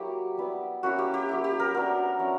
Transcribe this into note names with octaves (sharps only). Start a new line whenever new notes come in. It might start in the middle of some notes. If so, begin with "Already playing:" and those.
Already playing: F#3 A#3 E4 G4
G3 B3 E4
A#3 C#4 E4 F#4
G4
G4
F#3 A#3 E4
G4
A#4
F#3 B3 D4 A#4
F#3 C#4 E4